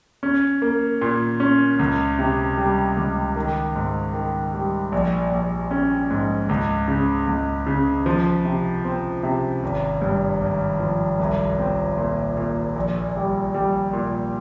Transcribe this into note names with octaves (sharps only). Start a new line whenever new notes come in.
C#4
A#3
A#2
C#4
C#2
C3
G3
C#2
D#3
G#2
D#3
G3
A#1
A#1
C#4
G#2
C#2
C#3
C#2
C#3
F3
C3
C4
C3
G#1
G2
G#1
F3
C2
C4
A#2
A#2
A#1
G3
G3
A#2